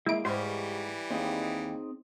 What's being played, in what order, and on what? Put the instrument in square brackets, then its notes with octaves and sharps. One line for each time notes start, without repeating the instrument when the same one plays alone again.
[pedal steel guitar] G#3 A#3 [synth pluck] E4 D7
[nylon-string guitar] G#2 [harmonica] E3 G3 [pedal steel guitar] G4 C#6 F6 [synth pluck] C5
[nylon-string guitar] D#2 [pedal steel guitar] C4 D#4 G#4